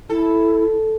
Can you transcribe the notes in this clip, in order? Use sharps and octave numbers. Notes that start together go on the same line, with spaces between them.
E4 A4